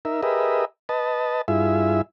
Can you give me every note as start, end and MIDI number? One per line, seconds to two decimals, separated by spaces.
0.05 0.21 63
0.05 0.21 70
0.05 0.21 76
0.23 0.65 67
0.23 0.65 68
0.23 0.65 70
0.23 0.65 71
0.23 0.65 75
0.23 0.65 76
0.89 1.42 71
0.89 1.42 75
0.89 1.42 81
1.48 2.01 43
1.48 2.01 64
1.48 2.01 65
1.48 2.01 68
1.48 2.01 76